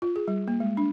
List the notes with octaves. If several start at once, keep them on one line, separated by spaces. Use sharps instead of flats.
F4
G#4
G3
A#3
G#3
D4